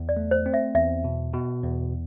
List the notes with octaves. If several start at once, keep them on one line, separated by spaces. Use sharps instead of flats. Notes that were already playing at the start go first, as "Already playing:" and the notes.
Already playing: E2
D5
A3
C5
C4
E5
E2 E5
B2
B2
E2